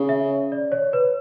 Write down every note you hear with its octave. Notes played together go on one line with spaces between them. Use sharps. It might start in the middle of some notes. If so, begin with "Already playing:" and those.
Already playing: C#3
E5
D5
C#5
B4